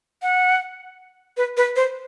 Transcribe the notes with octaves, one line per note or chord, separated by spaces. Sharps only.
F#5
B4
B4
C5